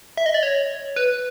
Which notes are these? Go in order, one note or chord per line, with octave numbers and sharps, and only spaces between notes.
E5
D#5
D5
C#5
B4